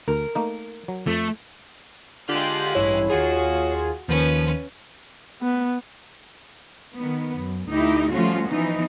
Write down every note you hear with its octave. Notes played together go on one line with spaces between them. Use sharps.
D2 A#4
A3 A#3 D#4
F#3
F2 A3
D3 G#3 F4 G4 F#6
A1 G2 E4 C#5
D#2 F4 F#4 G#4
D#2 D#3 F3 C#4 B4
B3
D#3 B3
F#2
D2 D#4 E4 G4
F3 G3 A3 C#4 F4 F#4
E3 F3 B3 D#4